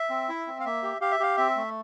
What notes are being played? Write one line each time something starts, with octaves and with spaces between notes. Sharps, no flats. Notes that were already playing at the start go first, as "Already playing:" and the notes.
Already playing: E5
C4
E4
C4
F5
A#3 E5
G4
G4 F5
E5
G4 F5
C4 E5
A3